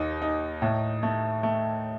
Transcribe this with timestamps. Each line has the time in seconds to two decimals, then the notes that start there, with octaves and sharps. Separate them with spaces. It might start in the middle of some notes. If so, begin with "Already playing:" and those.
Already playing: D#2 D#4
0.22 D#4
0.62 A2
1.03 A3
1.43 A3